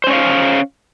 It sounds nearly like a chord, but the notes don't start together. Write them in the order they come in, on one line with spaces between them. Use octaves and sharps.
C5 C#4 C#5 F5